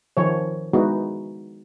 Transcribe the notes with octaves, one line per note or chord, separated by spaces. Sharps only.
D#3 F3 C#5
G#3 B3 D#4 E4 F#4